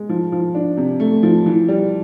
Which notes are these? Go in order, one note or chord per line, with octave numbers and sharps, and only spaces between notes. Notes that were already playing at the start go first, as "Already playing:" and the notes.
Already playing: G#3
F3
F3
D4
C3
A3
F3
E3
G3